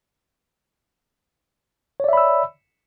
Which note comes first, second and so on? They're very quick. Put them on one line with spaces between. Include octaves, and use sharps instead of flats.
C#5 D5 E5 B5 E6